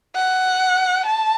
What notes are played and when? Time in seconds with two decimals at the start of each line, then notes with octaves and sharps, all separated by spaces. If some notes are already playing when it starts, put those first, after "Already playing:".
0.15 F#5
1.06 A5